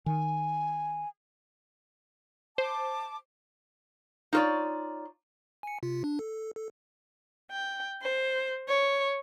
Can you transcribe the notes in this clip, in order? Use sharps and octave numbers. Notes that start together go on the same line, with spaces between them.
D#3 G#5
C5 A5 D6
D#4 F4 A4 C#5 D5
G#5 C#7
C3 F4
D4
A4
A4
G5
C5
C#5